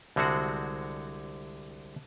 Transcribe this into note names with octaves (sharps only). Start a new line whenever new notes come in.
C2 D3 G#3 C4 F#4 F#5